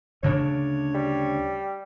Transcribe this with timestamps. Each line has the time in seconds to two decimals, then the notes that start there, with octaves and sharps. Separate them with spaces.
0.23 D2 C#3 D4 C#5
0.95 G3